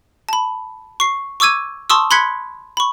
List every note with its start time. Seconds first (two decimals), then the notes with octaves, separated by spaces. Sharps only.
0.29 A5 B5
1.00 C#6 C7
1.40 C#6 D6 E6 G#6 D#7
1.90 A5 C6 C#6 D#6 E6
2.11 B5 C6 F#6 G#6 B6 C#7
2.77 B5 C#6